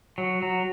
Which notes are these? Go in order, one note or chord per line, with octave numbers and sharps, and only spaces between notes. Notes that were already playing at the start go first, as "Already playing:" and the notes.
F#3
F#3